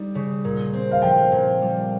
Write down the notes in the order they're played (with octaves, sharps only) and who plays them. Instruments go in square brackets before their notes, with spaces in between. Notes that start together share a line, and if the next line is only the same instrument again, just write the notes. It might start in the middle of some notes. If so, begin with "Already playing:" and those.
Already playing: [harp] G3 D#4
C#3
A#2
C4
[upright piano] F5
[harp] F3 [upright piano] G5
[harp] A#2
G3